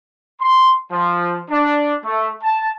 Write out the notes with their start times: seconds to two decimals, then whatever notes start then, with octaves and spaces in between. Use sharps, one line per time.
0.40 C6
0.91 F3
1.50 D4
2.05 A3
2.43 A5